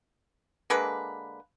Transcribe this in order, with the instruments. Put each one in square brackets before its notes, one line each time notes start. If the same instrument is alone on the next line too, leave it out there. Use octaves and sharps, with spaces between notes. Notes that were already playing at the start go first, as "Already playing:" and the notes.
[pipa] D3 G#3 A#3 B4